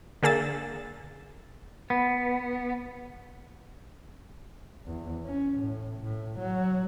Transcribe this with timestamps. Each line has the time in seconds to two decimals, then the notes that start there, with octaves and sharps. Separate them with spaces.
0.23 D3 A#3 G#4 E6 A6
1.90 B3
4.87 E2
5.26 C#4
5.58 A2
6.02 A2
6.39 F#3